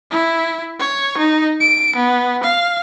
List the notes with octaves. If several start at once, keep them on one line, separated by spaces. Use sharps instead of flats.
E4
C#5
D#4
D7
B3
F5